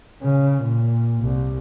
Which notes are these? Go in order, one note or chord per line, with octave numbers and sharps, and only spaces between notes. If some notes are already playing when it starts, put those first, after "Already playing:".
C#3
A#2
C2